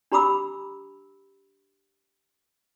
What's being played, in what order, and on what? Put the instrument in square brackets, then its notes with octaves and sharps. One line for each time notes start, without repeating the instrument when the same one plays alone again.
[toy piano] D4 G4 A#5 B5 D6 E6